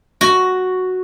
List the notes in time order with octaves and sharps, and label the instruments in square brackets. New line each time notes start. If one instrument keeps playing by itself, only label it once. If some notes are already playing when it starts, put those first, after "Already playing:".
[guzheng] F#4